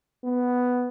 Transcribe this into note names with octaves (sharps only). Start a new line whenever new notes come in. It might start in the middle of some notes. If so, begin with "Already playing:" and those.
B3